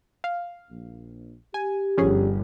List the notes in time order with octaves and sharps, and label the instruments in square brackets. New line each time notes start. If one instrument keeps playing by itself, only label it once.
[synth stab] F5
[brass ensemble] A#1
[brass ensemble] G4 [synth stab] G#5
[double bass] G1 [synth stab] F3 C#4 G#4